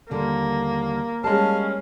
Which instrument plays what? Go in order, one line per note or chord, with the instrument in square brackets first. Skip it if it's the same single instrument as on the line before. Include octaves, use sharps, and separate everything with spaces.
[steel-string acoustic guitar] D#2 D3 G3 [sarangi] A#3
[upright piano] G3 G#3 [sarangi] C#4 [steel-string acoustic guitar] D#5 A5 [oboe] F5